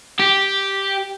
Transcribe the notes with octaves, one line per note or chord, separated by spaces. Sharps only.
G4